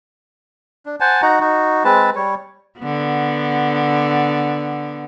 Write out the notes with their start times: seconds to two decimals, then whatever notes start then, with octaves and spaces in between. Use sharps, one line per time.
0.86 D4
1.00 C5 F#5 G#5 A5
1.22 D#4 F#4 F#5 A#5
1.40 D#4 F#4
1.84 G#3 C4 B4 A5
2.16 G3 C#5
2.80 D3 B3